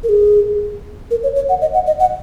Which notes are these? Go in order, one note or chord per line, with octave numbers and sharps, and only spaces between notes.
A#4
G#4
A#4
C#5
C#5
F#5
D#5
F#5
D#5
F#5